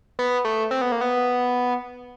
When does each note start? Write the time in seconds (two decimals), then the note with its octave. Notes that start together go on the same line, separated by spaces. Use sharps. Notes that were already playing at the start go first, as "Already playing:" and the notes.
0.19 B3
0.45 A3
0.71 C4
0.81 B3
0.92 A#3
1.01 B3